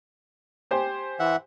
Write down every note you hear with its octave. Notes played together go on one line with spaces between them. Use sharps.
G4 C5 G#5
E3 E5 F#5